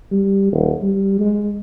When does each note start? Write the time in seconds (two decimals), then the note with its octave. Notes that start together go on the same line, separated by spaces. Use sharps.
0.12 G3
0.52 D#1
0.82 G3
1.20 G#3